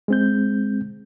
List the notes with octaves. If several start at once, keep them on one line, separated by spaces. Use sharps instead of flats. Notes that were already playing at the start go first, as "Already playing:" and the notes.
G#3 C4 G6